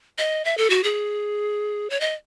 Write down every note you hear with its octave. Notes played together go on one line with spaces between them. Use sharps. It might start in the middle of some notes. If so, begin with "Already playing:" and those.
D#5
E5
A4
F#4
G#4
C#5
D#5